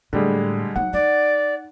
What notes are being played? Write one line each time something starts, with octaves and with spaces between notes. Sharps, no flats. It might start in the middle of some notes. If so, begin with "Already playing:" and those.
A2 D3 G3 G#3
F#3 D#4 F#5
D#4 D5